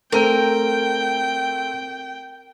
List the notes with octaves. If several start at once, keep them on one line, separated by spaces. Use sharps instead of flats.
A3 C4 A#4 G5 D#7